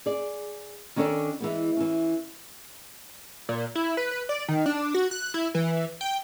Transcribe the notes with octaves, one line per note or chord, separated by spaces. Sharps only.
G#4 D5
D#3 C#4 D4 A4 C#5 D5
E3 G#3 B3
E3 C#4
A#2
E4
B4
B4
D5
D#3
D4
F#4
F#6
E4
E3
G5